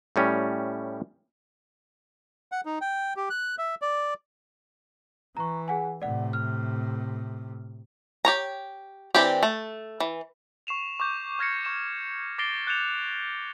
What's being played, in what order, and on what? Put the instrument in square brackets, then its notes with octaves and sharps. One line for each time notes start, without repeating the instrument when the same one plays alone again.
[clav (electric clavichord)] A2 G3 C#4
[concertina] F#5
D#4
G5
G4
F#6
E5
D5
[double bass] E3 [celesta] A#5 C#6
[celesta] G#4 F#5 G#5
[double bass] A2 C3 [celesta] D5 F#5
[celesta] F6
[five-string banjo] G4 C#5 A#5
E3 C4 D4 G4
A3
E3
[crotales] C#6 C7 E7 F7
C#6 D6 G6
D6 F6 G#6 A#6 C7 C#7
C#6 E7
D6 A6 A#6 C7 D7 G7
F#6 G6 A6 C#7 E7 F7